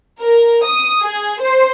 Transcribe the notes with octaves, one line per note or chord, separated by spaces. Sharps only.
A#4
D#6
G#4
C5